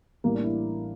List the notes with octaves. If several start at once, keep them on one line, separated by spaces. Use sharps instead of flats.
A1 A2 E3 G3 A#3
D4
E4